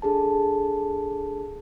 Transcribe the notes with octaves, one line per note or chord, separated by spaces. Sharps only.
D4 G#4 A4 A5